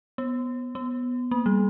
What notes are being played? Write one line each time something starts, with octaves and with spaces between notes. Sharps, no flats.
B3
B3
A#3
G3